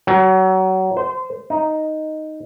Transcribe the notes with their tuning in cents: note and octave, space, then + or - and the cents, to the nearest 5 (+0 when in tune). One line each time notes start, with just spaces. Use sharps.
F#3 +25
C5 -25
D#4 +0